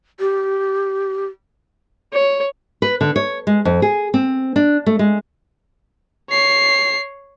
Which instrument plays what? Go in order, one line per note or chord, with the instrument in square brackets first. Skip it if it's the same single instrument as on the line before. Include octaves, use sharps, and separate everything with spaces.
[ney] G4
[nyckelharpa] C#5
[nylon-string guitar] B4
D3
C#5
G#3
F2
G#4
C4
D4
A3
G#3
[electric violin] C#5 C7